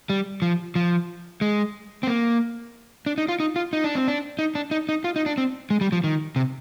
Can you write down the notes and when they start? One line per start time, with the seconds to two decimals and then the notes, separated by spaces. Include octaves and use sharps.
0.10 G3
0.42 F3
0.75 F3
1.41 G#3
2.03 C4
2.07 A#3
3.06 D4
3.18 D#4
3.29 F4
3.40 D#4
3.56 F4
3.73 D#4
3.84 D4
3.95 C4
4.08 D4
4.39 D#4
4.55 D4
4.71 D#4
4.89 D#4
5.04 F4
5.16 D#4
5.26 D4
5.38 C4
5.70 G#3
5.81 G3
5.92 F3
6.04 D#3
6.36 C3